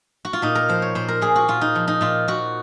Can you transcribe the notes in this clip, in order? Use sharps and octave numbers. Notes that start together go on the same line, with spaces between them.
F#4
F4
A#2 D#4
A#4
F3 C5
C#5
A#2 C5
A#4
A#2 G#4
F#4
A#2 F4
D#4
F3
D#4
A#2 F4
A#2 F#4